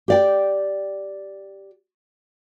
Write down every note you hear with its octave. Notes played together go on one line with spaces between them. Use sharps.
G4 D5 G5